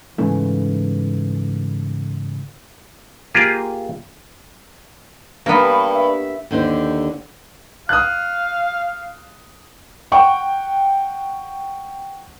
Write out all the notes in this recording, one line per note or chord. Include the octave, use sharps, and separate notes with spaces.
G#2 C#3 E3 A3
A#3 F4 G4 G#4
G2 A#3 B3
E5
D#2 D3 C5
F5 D#6 F#6
F#5 G5 C#6